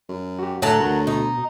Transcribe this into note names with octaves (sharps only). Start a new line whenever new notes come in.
F#2
F#4 G4
A2 D3 F#3 A3 A5
D2 A#4
B2 D#4 A#5